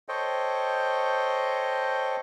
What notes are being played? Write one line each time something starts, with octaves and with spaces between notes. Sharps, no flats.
A4 C5 C#5 D#5 G5